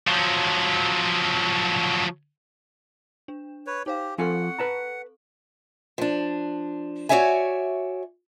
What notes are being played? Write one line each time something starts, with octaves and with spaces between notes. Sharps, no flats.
F3 F#3
D4
B4 C#5
D#4 G4 C5 F5
F3 C4 F4 A4 F#5 G#5 C#6
B4 A5 A#5
F3 D4
F#4 G#4 C#5 D5 E5 G#5